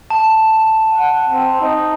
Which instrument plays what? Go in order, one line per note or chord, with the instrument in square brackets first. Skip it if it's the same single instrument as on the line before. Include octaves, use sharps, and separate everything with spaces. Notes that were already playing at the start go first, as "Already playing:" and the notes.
[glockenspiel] A5
[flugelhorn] F#5
C4
D#4